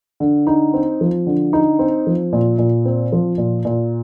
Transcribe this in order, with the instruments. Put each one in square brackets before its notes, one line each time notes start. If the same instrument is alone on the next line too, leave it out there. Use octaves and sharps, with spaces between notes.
[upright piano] D3
D#4
C4
F3
D3
D#4
C4
F3
A#2
A#2
C4
F3
A#2
A#2